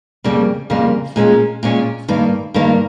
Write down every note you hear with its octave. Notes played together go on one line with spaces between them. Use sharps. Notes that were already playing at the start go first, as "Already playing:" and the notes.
F2 C#3 G3 A#3
F2 C#3 G3 A#3
A#2 G#3 C#4
A#2 G#3 C#4
G2 D#3 A#3
G2 D#3 A#3